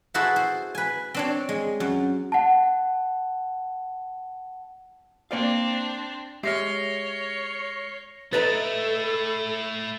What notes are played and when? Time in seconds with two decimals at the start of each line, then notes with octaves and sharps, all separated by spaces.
0.14 E4 F#4 G#4 A4 B4 C5
0.36 C5
0.75 B4 G#5
1.14 C4 D4 C#5
1.49 G#3
1.80 F#2
2.32 F#5 A5
5.31 A#3 C4 D4 D5 F5
6.43 G#3 G4 C#5 E5 F6 A#6 C7
8.33 A3 E4 A4 B4 D#5 A#5 A6